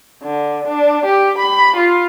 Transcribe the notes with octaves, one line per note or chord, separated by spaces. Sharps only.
D3
D4
G4
B5
F4